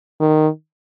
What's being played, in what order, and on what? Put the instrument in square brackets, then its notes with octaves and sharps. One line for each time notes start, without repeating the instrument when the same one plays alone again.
[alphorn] D#3